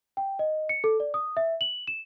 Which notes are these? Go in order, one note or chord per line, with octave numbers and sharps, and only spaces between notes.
G5
D#5
C#7
A4
D5
D#6
E5
F#7
E7